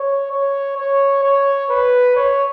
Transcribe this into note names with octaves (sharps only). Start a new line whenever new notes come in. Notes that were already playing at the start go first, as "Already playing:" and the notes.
Already playing: C#5
C#5
C#5
C#5
B4
C#5